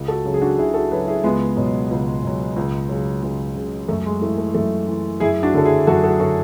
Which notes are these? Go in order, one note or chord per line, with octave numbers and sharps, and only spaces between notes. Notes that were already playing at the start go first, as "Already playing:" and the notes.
Already playing: C#2
F#4 A4
C#3 F#3
G#4
D4 F#4
C#2 E4 G#4
F#4 A4
C#3 F#3 G#4 B4
E4 G#4
C#2 G#3 B3
B2 F#3
C#2
B2 F#3
C#2
C#3 F#3
C#2 G#3
C#3 F#3
F#2 A3
G#3
E3 A3
A3
F#2 A3
E3
F#2 E4 G#4
D4 F#4
D3 F#3 A4
E4 G#4
F#2 F#4 A4
F#4 A4
D3 F#3 F#4 A4